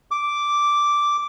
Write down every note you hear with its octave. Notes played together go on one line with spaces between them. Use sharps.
D6